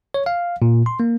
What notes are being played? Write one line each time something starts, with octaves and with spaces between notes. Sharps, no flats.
C#5
F5
A#2
C6
A#3